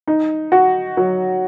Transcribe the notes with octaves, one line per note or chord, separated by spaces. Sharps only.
D#4
F#4
F#3